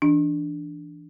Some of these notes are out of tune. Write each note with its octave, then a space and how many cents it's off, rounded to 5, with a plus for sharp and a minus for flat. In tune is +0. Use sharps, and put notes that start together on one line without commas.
E3 +0 D4 +0